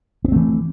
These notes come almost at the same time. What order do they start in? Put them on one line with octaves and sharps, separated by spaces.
B3 C4 A3 E3